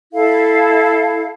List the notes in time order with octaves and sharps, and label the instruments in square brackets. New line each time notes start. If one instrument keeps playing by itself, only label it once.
[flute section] E4 A4 F5